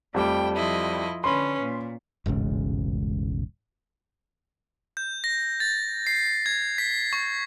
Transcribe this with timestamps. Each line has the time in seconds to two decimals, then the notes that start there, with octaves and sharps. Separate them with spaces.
0.14 F2 G3 A3 G5 D6
0.55 F3 E4 D#5
1.24 D3 C#4 B4 B5 C6
1.62 A#2
2.26 E1 A1 G#2 C#3
4.97 G6
5.24 A#6
5.60 A6
6.07 C7
6.46 G#6
6.78 B6
7.13 C#6